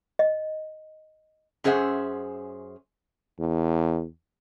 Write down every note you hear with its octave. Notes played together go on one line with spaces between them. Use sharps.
D#5
F#2 C#4 G#4 C5 E5 F#5
E2